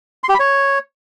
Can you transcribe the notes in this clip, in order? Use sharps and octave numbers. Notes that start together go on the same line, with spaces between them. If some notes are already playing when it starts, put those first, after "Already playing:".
C6
G4
B5
C#5